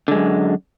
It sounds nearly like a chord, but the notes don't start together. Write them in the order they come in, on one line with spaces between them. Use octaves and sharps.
D3 G#3 F#2